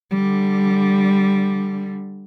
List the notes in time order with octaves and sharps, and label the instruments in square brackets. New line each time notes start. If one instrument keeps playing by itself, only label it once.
[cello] D3 G3